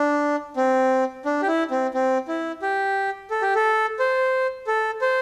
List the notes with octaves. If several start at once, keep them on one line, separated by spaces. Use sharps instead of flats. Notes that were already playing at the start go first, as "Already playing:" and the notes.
Already playing: D4
C4
D4
G4
E4
C4
C4
E4
G4
A4
G4
A4
C5
A4
C5